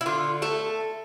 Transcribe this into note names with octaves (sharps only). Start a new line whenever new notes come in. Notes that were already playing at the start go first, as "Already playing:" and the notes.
E4
D3 F4
A3 A4